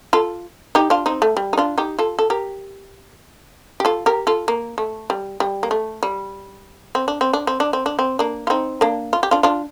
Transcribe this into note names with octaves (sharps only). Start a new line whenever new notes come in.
F4 A4
D#4 G4
D4 F4
C4 D#4
A3
G3
D#4
D4 F4
D#4 G4
F4 A4
A4
G4 A#4
G4
F4 A4
G4 A#4
F4 A4
A#3
A3
G3
G3
A#3
A3
G3
C4
D4
C4
D4
C4
D4
C4
D4
C4
A#3 D4
F4
C4 D#4
A#3 D4
F4
G4
D4 F4
D4 F4